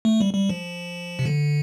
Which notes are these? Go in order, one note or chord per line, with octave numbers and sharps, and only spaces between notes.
A3
G3
G3
F3
C3
D3